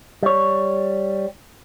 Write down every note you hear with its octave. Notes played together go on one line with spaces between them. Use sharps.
G3 C#5